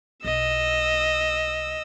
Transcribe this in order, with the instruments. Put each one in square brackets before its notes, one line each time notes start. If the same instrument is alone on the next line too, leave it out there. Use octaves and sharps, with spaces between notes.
[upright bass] B1 [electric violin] D#5 E6